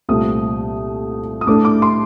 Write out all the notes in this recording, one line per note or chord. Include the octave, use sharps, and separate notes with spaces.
C2 A#2 A3 C4 D#6
D#6
A2 A3 D4 D6
D6
C6